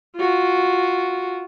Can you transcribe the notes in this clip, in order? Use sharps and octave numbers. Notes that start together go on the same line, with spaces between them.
F4 F#4